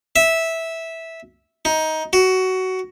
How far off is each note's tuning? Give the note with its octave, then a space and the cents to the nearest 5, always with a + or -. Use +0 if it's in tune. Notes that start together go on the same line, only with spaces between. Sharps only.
E5 -10
D#4 +15
F#4 +15